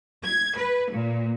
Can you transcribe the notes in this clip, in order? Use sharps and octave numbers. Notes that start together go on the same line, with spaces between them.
G#6
B4
A#2